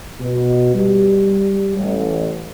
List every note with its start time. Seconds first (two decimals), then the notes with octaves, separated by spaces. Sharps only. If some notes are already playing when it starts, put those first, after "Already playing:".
0.21 B2
0.74 G3
1.77 A1